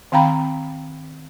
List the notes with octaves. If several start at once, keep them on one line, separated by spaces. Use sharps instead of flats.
D#3 C4 F5 G5 A#5 B5